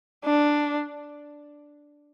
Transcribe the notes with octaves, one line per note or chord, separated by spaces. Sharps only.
D4